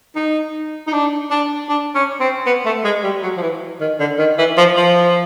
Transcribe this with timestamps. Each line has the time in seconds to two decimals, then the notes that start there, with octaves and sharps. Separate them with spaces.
0.16 D#4
0.87 D#4
0.92 D4
1.31 D4
1.69 D4
1.95 C#4
2.20 C4
2.46 B3
2.65 A3
2.84 G#3
3.04 G3
3.23 F#3
3.37 F3
3.42 E3
3.81 D#3
4.00 D3
4.19 D#3
4.38 E3
4.57 F3
4.77 F3